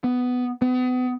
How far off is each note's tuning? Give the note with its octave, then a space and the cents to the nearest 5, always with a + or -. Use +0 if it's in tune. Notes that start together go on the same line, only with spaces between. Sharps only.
B3 +10
B3 +35